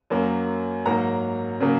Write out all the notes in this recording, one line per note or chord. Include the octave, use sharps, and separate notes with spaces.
F#2 F#3 A#3
G#2 F#3 A#3 A#5
C#3 F#3 A#3